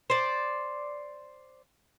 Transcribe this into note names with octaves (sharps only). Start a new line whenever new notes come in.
C5 D5